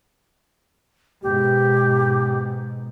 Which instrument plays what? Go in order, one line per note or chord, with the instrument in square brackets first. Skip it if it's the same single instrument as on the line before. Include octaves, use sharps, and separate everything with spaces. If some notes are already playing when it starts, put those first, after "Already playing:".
[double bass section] G#2 B2 [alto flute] G4